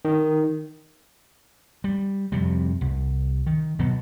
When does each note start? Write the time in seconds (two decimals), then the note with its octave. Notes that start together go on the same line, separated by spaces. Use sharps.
0.05 D#3
1.84 G3
2.32 F2 C3 G3
2.81 C2
3.47 D#3
3.79 B2 F#3 B3